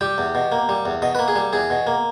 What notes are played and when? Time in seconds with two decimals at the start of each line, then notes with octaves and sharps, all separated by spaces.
0.01 G3 G4
0.18 E2
0.35 B2
0.52 A#3
0.69 G3
0.85 E2
1.02 B2 D#5
1.15 B4
1.19 A#3
1.28 G#4
1.36 G3
1.53 E2 G#4
1.70 B2
1.87 A#3